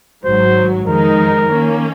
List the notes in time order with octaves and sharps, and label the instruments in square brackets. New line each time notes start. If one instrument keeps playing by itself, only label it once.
[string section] G#1 G#2 F#3 [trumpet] C5
[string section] F2 D#3 G#3 D#4 [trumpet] A#4
[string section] D#3 A#3 C#4